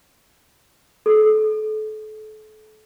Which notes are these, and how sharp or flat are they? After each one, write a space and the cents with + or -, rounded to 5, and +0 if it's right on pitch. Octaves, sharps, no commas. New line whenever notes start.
A4 -35